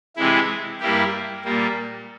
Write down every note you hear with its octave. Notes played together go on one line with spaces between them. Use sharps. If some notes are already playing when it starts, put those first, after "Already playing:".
C3 E3 G#3 E4
G2 G3 A#3 E4 G4
A#2 G3 A#3